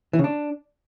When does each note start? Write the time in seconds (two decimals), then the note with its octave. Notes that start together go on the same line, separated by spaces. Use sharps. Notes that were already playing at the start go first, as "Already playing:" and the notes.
0.13 E3
0.19 C#3
0.24 D4